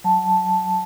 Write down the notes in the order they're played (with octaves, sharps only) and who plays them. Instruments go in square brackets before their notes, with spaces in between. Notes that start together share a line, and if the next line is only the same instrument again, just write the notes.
[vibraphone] F#3 A5